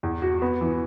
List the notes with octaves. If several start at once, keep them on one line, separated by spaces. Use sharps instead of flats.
E2
F#4
B3
E3